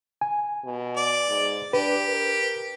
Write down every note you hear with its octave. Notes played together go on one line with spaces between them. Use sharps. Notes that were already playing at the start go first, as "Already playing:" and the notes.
G#5
B2
D5
G#2
D4 G4 B4
A#4